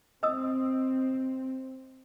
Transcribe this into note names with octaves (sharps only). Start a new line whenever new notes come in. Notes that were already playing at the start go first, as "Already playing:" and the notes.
C4 D#5 D#6 E6